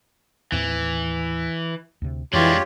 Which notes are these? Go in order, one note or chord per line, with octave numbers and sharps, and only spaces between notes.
D#2 A2 E3 C4
D2 C3
F2 E3 F3 G#3 D4 F4 G4 C#5